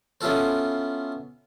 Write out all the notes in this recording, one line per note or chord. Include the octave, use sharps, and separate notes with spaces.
B3 C#4 E4 F4 A4 C5